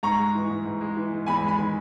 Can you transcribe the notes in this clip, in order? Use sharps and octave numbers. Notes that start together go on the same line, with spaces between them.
G#2 A#5 C#6
G#3
E3
G#2
G#2
G#3
E3
G#2
E2 G#5 B5
G#3
G#5 B5
D#3